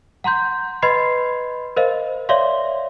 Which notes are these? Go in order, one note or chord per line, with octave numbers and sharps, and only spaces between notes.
F#5 A#5 C6 G6
B4 D#5 B5 C6 G#6 C7
A#4 C5 D#5 F5
C#5 D5 E5 F5 C6